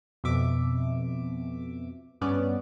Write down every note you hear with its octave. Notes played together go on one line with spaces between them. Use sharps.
F2 B2 E5 D6
G2 B3 C#4 D5